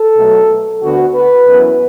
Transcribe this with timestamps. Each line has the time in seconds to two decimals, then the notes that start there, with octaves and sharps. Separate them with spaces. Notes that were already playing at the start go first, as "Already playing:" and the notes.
Already playing: A4
0.17 B2 F#3 A3
0.82 D2 D3 B3 F#4
1.14 B4
1.48 F#2 E3 B3